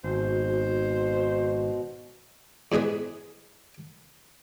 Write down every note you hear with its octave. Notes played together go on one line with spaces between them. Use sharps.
G#1 B2 C5
E2 C3 G#3 G#4 B4